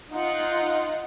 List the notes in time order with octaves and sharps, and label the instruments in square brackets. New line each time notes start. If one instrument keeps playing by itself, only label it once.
[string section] D#4 F4 F#5